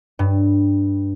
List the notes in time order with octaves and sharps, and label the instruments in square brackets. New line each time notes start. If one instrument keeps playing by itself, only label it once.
[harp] G2